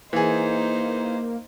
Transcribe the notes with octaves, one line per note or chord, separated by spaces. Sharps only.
E3 A#3 D#4 G#4 C5